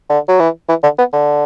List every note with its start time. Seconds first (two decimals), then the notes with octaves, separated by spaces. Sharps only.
0.09 D3
0.28 F#3
0.39 E3
0.69 E3
0.83 D3
0.98 B3
1.13 D3